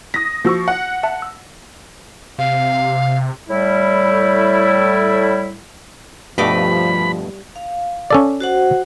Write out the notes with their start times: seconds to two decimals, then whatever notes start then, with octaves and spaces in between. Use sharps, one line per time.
0.14 D#6 A#6 B6
0.45 F3 A#3 F#4 C#6 E6
0.68 F#5
1.03 E5 A5
1.22 E6
2.39 C3 F5
3.49 A2 G3 E4
6.38 G2 B2 F3 G3 A3 D#5 B5 D6
7.56 F5
8.11 C#4 A4 D5
8.40 F#4 C5 F#5